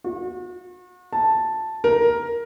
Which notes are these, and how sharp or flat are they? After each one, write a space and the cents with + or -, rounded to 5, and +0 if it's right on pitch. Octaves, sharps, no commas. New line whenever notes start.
F#4 -40
A5 +0
A#4 +10